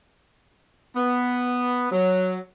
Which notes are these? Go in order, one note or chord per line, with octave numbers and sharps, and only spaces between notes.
B3
F#3